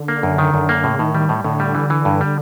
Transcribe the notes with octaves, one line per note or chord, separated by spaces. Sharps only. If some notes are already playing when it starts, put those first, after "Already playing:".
Already playing: D3
A#3
F#2
D#3
F#2
A#3
A2 C#3
A2 D#3
D#3 G3
A2
A2 D3
G3
E3
E3
G2
G3